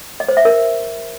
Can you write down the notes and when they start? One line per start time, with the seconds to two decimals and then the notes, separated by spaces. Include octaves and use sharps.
0.20 D#5
0.28 C5
0.37 E5
0.45 A#4